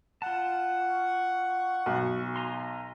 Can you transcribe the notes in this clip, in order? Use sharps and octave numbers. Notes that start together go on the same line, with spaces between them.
F4 F#5 A5
C#6
B1 F#4
G#5 A#5 C6